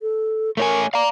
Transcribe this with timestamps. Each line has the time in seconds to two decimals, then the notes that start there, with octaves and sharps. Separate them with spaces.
0.01 A4
0.57 A3 A#4 C#5 G#5
0.94 D5 F5 A#5